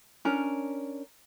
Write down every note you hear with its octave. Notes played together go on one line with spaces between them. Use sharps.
C#4 D4 A#4